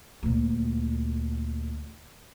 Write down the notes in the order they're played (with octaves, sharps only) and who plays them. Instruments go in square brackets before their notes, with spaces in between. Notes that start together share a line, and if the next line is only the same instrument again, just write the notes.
[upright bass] D2 A#2